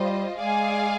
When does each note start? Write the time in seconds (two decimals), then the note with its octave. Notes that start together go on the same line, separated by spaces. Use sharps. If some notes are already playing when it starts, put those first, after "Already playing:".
Already playing: G3 F4 C5 D#5
0.39 G#3 G#4 D5 F5 G#5